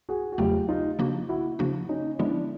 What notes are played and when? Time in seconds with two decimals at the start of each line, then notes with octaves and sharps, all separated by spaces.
0.09 F#4 G#4
0.32 F#4
0.38 E2 C#3 F#3 A3 F4 G4
0.68 D#4 F4
0.99 C#3 F3 A#3 D4 F#4
1.29 E4 F#4
1.59 C#3 F3 A#3 D4 F#4
1.89 C#4 D#4
2.19 D3 F3 G#3 B3 D4 E4